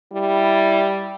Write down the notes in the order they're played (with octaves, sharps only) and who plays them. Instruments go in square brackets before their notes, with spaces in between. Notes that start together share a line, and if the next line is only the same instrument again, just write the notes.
[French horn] G3 [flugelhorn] E4